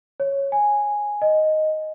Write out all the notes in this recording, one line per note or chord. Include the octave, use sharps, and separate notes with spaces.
C#5
G#5
D#5